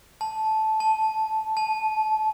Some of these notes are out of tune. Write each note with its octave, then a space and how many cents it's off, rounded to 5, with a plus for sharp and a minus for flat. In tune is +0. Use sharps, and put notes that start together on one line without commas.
A5 -15
A5 +0
A5 -30